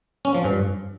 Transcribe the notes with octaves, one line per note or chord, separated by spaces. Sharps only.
C#4
F3
G2